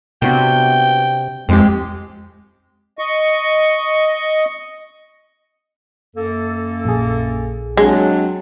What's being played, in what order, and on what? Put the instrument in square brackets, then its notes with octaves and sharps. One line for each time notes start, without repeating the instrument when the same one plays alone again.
[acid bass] C3 [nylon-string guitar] B3 D4 F#4 [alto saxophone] G5
[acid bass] F2 [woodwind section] G#3 [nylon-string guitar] C4 G4
[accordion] D#5 C#6
[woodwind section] F#2 A#3 A4
[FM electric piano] A#1 G#4
[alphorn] F#3 [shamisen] G#3 [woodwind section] C4 D4